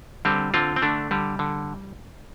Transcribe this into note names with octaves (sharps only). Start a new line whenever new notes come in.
D3 G3 C4
D3 C4 F4
C4
D3 A3 D4
D3 G3
D3